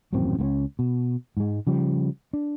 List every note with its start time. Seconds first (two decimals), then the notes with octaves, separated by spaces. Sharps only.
0.13 D#1 A1 F#2 C4
0.39 C#2 A#3 C#4
0.79 B2
1.37 G#2 G#3
1.67 C#3 F3 G3
2.33 D4